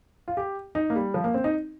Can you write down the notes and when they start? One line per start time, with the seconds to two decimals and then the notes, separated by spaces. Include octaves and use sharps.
0.28 F4
0.37 G4
0.75 D#4
0.90 A#3
0.96 G3
1.14 F3
1.24 A#3
1.34 C4
1.44 D#4